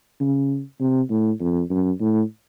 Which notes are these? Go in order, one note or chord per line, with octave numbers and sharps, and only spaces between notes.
C#3
C3
A2
F2
F#2
A2